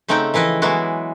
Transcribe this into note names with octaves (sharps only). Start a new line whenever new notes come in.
C#3 A3 C4 D#4 F#5 G5
E3 F3 E4 B4 D#5
E3 F#3 G#3 B3 E4 F#4